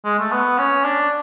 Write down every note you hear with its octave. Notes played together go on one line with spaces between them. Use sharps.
G#3
A3
B3
C#4
D4